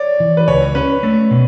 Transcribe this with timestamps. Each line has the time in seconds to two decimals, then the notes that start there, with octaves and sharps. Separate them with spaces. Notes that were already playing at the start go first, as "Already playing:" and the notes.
Already playing: C#5 D5
0.20 E3
0.37 B4
0.48 C#2 C#5
0.75 C#4 B4
1.03 A3
1.31 B2